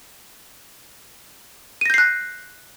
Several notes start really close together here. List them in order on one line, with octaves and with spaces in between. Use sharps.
D#7 A#6 G6 C7 F#6